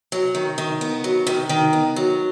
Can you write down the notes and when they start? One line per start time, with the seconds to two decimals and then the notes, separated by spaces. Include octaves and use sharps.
0.12 F#3
0.35 D#3
0.58 D#3
0.81 B3
1.04 F#3
1.27 D#3
1.49 D#3
1.73 B3
1.96 F#3